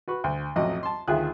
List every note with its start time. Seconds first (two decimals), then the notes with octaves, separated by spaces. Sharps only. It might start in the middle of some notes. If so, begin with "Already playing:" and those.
0.08 F#4 B4 C#6
0.24 D2
0.56 A1 F2 F#3 D#5
0.83 A5 C6
1.08 D2 D#3 F4 G#4 E5 F#6